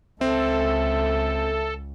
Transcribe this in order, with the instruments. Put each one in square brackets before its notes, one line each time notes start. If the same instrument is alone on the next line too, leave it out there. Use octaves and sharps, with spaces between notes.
[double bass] C#2 [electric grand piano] C4 [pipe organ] A4 [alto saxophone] E5